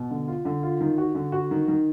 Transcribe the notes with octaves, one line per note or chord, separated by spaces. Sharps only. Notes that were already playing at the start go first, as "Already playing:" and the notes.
Already playing: B2
D3
F4
D3
F4
D#3
F#4
D3
F#4
D#3
D#3